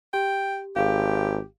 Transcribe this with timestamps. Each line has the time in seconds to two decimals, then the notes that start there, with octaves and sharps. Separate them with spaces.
0.14 G4 G5
0.76 G#1 G4 G#4 F5